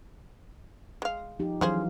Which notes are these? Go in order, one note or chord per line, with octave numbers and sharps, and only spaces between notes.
G#3 F5
F3 D#4 G4
C#3 E3 F#3 G#4 C5 F5